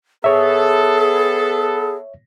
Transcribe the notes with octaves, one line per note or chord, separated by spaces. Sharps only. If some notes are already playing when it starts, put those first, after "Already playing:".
B3 G#4 A4 C#5 E5